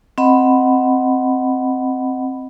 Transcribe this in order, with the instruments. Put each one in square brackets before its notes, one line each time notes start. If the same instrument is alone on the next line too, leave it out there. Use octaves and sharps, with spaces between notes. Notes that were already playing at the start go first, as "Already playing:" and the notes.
[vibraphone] C4 D#5 F#5 B5